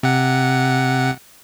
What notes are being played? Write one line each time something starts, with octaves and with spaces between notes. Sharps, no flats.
C3 F#5